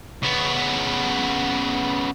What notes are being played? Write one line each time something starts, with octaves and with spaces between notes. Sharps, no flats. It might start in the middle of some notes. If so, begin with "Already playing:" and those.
C#3 B3